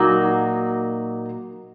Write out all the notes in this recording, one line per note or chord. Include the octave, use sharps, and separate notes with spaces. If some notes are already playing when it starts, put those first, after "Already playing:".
Already playing: A#2 F#3 A#3 D#4 F#4